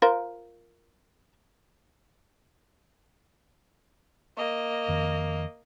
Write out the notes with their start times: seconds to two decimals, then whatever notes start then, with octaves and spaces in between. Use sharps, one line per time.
0.02 F4 A#4 C5
4.37 A#3 D#5
4.88 F2 D#3